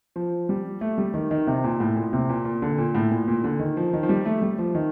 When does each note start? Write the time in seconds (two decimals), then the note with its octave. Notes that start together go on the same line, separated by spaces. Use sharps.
0.16 F3
0.49 G3
0.81 A3
0.98 G3
1.14 D#3
1.31 D#3
1.47 C3
1.64 A#2
1.80 A2
1.96 A#2
2.13 C3
2.29 A#2
2.45 A#2
2.62 D3
2.78 A#2
2.95 A2
3.11 A#2
3.28 A#2
3.44 D3
3.59 D#3
3.77 F3
3.93 D#3
4.03 F3
4.09 G3
4.25 A3
4.42 G3
4.59 F3
4.75 D#3